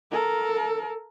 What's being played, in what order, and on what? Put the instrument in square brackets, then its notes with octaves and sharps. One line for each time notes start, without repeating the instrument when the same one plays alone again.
[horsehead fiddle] A4 A#4